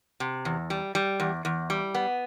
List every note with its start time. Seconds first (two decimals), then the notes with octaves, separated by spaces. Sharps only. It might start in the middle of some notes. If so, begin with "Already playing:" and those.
0.20 C3
0.45 E2
0.70 G3
0.95 G3
1.20 E2
1.45 E2
1.70 G3
1.95 B3